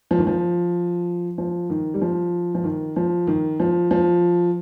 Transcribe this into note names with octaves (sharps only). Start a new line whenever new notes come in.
F3
D#3
F3
F3
D#3
G3
F3
F3
D#3
F3
D#3
F3
F3